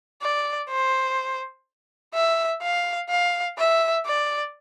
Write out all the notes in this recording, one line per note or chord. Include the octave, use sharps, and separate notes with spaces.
D5
C5
E5
F5
F5
E5
D5